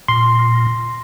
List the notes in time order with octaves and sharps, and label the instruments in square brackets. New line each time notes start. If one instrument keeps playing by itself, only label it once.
[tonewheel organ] A#2 [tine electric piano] C6